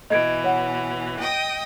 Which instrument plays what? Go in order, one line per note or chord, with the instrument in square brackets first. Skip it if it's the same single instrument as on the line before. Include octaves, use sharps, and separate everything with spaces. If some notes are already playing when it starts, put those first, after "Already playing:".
[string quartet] B2 E3 [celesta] D#5 G#6 D7
[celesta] C#5 F#5
[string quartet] D#5 G5 D#6